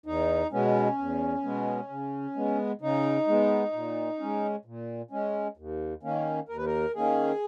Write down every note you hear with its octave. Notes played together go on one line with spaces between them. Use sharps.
E2 D#4
B2 G#3 B3 C#4
E2
B2 G#3 B3
C#3
G#3 B3
C#3 D#4
G#3 B3
A#2
G#3 C#4
A#2
G#3 C#4
D#2
D#3 A#3 C#4
D#2 A#4
B4
A#4
D#3 A#3 C#4 G#4